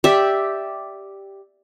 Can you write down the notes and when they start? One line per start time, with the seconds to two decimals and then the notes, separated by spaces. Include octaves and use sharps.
0.04 G4 D5 E5